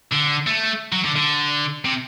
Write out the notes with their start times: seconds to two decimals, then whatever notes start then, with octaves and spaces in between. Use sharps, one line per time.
0.12 D3
0.47 A3
0.92 F#3
1.04 D3
1.16 D3
1.85 C3